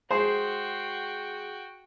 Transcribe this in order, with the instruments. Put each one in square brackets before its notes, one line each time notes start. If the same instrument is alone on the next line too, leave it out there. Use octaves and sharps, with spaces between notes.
[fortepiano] G#3 G#4 C5 [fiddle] F#4 G5